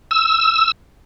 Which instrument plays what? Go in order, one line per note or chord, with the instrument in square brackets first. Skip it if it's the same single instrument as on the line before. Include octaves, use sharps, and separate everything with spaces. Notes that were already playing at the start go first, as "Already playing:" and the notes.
[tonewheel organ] E6